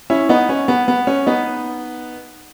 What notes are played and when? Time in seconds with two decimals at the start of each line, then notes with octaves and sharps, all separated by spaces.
0.10 C#4 E4
0.29 B3 D#4
0.49 C#4
0.68 B3
0.88 B3
1.07 C#4
1.26 B3 D#4